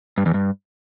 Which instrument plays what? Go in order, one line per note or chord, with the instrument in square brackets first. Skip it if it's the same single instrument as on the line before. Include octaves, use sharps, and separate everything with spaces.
[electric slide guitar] G2
E2
G2